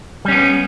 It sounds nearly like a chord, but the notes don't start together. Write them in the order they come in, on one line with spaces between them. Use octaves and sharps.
G3 C#4 B3